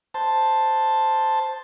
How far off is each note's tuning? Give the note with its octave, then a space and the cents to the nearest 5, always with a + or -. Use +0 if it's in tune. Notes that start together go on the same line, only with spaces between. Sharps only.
C5 +0 A5 +0